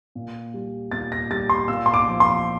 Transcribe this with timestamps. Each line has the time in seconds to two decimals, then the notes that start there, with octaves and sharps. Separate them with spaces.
0.15 A#2
0.54 G3
0.91 A#2 A6
1.12 A#6
1.30 G3 A6
1.50 C6
1.68 A#2 E6
1.86 C6
1.94 D6
2.08 F3
2.20 C6